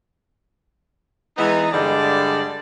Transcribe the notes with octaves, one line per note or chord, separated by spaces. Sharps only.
E3 G#3 B3 D#4
G2 D3 G#3 D5 A5